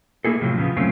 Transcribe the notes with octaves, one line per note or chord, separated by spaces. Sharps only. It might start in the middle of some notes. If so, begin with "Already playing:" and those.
A3 A#3 E4 G#4 A4
A2 C3 F3 F#3
C#3 F3 A#3 B3
A#2 F#3 A3 C4 C#4 F4